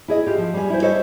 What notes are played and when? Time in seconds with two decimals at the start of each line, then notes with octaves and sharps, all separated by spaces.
0.08 E4 G#4 D#5
0.26 F4 G4
0.38 F3
0.54 G3 G#5
0.70 E4 C5
0.82 A4 C5 C#5 D#5